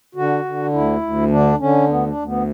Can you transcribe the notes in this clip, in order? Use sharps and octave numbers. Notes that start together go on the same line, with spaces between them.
D3 F#4
D3
D2 E4
D2
D3 D4
D3 C#4
D2 B3
D4
D2
B3